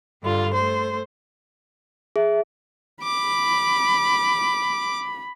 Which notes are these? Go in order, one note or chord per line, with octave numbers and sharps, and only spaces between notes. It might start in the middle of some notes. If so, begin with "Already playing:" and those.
G2 D3 F4
A3 C5
G#4 E5
B5 D6